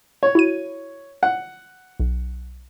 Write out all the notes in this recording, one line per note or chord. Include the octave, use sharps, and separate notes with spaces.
C#5
E4 F#4 D#7
F#5
B1